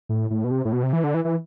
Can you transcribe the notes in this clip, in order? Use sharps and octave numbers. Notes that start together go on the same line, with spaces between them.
A2
A2
B2
C3
A2
B2
C3
E3
D3
E3
E3